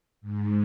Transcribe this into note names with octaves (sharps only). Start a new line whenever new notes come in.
G#2